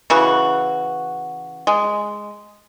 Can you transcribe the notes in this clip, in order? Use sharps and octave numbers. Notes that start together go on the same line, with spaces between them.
C#3 E3 F#4
G#3